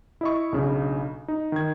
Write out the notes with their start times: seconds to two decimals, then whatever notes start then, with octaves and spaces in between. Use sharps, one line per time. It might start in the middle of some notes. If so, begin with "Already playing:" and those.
0.21 E4 D#5 C#6
0.52 B1 C#3 D4
1.28 D#4
1.52 D#3 G#6